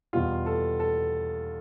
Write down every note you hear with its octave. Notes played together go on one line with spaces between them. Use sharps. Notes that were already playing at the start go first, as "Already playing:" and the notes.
E2 B2 G3 F4
A4
A4